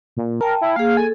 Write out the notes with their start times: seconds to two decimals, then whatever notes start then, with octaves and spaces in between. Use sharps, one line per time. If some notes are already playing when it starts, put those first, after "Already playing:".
0.17 A#2
0.41 A#4 G5 A5
0.61 E4
0.76 A#3 G#4 F5
0.97 A4 G#5